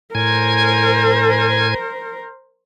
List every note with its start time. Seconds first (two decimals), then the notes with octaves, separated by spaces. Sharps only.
0.15 A2 A#4 C5 G#5 G#6